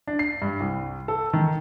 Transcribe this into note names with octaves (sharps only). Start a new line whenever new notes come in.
D4
C7
G2
C2
A4
D#3